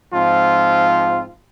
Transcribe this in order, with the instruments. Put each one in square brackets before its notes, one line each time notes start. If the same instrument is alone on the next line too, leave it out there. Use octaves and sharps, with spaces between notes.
[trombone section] G#2 F3 C4 F4